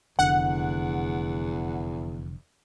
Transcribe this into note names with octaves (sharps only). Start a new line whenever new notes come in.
F1 E2 D3 F#5